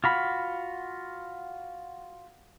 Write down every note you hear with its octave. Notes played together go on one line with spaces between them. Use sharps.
F4 F#4 B5